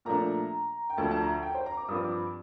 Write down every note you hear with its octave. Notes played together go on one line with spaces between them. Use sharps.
A#2 F3 A3 D4 A#5
G5
D2 D3 F3 A5
A5
A#5
G5
C5
A#5
D6
G2 F3 C4 D#6
D6